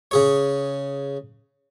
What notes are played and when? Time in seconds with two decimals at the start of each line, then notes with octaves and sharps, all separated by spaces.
0.11 C#3 G#4 C#5